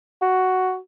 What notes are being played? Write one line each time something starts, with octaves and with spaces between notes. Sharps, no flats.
F#4